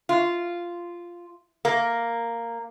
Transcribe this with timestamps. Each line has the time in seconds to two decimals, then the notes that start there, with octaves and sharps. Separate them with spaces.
0.09 F4
1.65 A#3